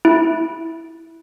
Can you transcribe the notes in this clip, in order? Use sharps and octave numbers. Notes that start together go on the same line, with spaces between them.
E4